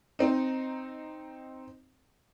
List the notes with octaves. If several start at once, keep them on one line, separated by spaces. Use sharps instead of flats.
C4 D#4